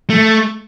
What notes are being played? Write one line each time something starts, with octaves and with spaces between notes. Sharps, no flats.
A3